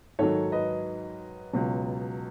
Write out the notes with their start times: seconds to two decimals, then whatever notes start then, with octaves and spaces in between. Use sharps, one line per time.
0.19 G#2 D#3 F#3 A4 C#5
0.52 B4 D#5
1.53 C#2 B2 F#3